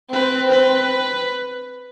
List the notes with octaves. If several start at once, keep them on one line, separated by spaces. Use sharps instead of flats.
C4 B4
B4